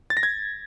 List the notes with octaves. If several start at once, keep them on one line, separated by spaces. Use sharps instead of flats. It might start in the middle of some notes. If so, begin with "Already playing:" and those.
A6
A#6
G#6